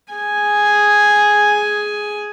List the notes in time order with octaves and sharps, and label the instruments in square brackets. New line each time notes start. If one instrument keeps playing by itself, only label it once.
[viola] G#4 G#5